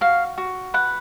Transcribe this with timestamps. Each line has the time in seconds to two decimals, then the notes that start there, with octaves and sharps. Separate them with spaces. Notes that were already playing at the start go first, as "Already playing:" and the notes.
0.01 F#4 F5
0.38 F#4
0.74 B4 F#5